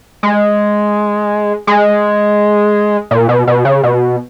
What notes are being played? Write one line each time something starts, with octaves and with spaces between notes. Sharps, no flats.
G#3
G#3
A#2
B2
B2
C#3
B2